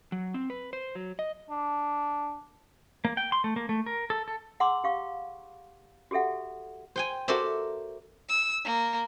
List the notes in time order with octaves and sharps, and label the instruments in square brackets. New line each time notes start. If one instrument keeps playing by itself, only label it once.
[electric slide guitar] F#3
C4
B4
C5
F#3
D#5
[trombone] D4
[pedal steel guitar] A#3
G5
C6
A3
A#3
A3
A#4
A4
A4
[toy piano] G#4 F#5 A#5 C6 D6 E6
G4 F5 C#6
F#4 G4 A4 E5 F#5
[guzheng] C5 G5 G#5
F#4 A4 A#4 C5 D5 E5
[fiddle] E6
A#3